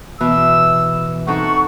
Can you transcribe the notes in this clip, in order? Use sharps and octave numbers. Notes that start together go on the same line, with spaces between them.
B2 E3 B3 E6
C4 D#4 A4 F#5 C#6